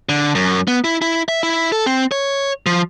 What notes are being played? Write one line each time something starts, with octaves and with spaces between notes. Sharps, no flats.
D3
F#2
B3
E4
E4
E5
E4
A4
C4
C#5
F3